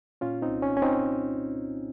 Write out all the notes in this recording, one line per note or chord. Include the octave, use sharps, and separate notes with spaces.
A#2 C#4 F4
C4 D#4
C2
C#4
C#4
C4 D#4